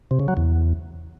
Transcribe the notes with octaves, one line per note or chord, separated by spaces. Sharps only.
C3
C#3
F#3
E2